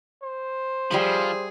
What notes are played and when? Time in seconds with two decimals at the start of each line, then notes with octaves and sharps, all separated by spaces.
0.23 C5
0.91 F3 G3 G#4 E5 B5